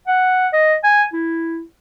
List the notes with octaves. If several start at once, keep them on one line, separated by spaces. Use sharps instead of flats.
F#5
D#5
G#5
E4